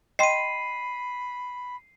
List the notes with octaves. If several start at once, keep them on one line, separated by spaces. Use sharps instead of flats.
D#5 G5 B5 C6 C7 D#7